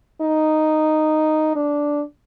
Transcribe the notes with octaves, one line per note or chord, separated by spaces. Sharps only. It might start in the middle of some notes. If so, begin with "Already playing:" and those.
D#4
D4